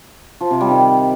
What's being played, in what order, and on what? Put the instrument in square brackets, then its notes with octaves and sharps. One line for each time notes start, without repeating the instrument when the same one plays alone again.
[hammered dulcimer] F3
C3
G3
D#3